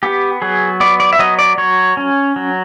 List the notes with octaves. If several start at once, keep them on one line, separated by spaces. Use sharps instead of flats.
B3 G4
F#3 G#4
B3 D5
D5
E5
F#3 D#5
D5
F#3 C#5
C#4
F#3